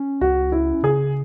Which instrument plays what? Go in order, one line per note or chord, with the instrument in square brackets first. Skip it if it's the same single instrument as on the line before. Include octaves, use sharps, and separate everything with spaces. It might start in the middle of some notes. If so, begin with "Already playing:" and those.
Already playing: [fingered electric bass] C#4
[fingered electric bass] C#2 [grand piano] F#4
[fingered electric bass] C#4 [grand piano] E4
[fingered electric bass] C#3 [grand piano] G#4